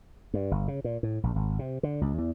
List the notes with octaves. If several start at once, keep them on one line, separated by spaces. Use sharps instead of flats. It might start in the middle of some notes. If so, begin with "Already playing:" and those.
G2
G1
C#3
A#2
A2
A#1
G#1
C3
D3
C#2
E2